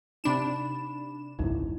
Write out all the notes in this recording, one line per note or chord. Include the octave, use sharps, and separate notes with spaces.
C3 D4 D#4 B5 D7 E7
G#1 C#2 F#2 D#4 E4